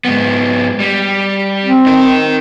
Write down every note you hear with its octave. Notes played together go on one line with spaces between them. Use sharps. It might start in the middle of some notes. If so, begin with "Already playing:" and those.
G#2 B3
G3
C4
D#4 A#4